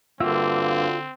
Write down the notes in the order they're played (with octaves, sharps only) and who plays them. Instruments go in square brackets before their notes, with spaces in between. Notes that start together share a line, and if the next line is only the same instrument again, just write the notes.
[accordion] G2 A#3 [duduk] D3 [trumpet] C4 [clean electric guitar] F4 F#4 E5